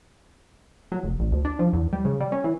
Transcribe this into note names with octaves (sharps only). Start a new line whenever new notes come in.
F#3
F1
A1
D2
D4
F3
E2
G3
C#3
G3
C#4
E3